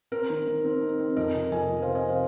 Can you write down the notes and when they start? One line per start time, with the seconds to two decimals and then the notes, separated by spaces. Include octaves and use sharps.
0.12 C4 A#4
0.30 D#3
0.47 D#3
0.64 C4
0.82 D#4
0.99 C4
1.16 F2 A#4 D#5
1.35 C3
1.52 F2 D#5 G#5
1.69 F2
1.82 C3 C5 F5
1.95 D#5 G#5
2.09 C5 F5